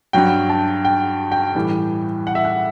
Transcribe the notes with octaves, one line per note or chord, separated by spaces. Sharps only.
G2 F#3 G5
A5
G5
G5
A2 E3 G3
F#5
E5
F#5